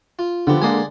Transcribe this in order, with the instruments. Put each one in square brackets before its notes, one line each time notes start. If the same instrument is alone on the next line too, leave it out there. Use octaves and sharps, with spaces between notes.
[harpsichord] F4
[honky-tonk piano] D3 [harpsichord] F3 B3 G4
[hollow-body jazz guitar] G#3 A#3 D4 [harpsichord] D5 D#5 G#5